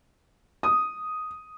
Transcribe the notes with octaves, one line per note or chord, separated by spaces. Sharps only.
D#6